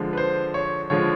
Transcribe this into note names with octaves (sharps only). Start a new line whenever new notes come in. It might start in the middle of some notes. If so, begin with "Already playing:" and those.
Already playing: D3 F3 G#3
B4
C5
C#5
D3 F3 G#3 C#5